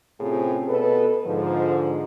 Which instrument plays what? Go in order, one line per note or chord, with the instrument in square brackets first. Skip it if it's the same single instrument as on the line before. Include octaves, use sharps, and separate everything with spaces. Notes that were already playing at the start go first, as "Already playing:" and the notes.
[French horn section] A2 C3 C4 C#4 F4 G#4
B2 A4 B4
G#2 D3 F3